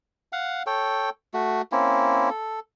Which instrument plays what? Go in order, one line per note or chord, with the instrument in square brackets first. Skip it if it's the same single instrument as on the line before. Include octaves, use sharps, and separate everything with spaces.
[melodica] F5 F#5
A4 C#5 G5
A3 F#4
A#3 C4 C#4 E4
A4